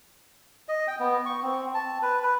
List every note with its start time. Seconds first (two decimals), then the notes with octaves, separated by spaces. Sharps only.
0.68 D#5
0.88 G5
0.99 B3
1.26 C#6
1.42 C4
1.74 A5
2.02 B4
2.23 B4